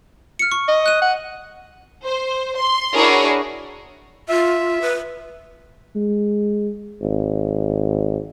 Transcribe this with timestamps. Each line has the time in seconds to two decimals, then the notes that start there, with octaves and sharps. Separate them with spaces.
0.39 F6 C#7
0.51 C#6
0.68 D#5
0.86 F#6 D#7
1.02 F#5
2.05 C5
2.56 C6
2.96 D4 E4 F#4 G#4 A#4 C#5
4.29 F4 E5
4.82 B4
5.96 G#3
7.02 G#1